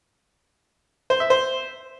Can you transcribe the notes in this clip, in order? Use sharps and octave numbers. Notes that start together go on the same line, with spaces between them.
C5
E5
C5